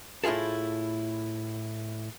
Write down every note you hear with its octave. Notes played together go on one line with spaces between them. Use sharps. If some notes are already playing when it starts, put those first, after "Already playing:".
A2 E4 F4 G#4 A4